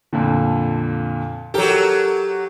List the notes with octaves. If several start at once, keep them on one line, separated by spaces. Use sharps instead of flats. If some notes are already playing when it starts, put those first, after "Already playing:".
F2 A#2 D3
F#3 G4 A4 A#4